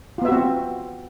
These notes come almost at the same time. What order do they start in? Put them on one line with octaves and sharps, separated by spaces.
F4 B3 E5 F#4 C4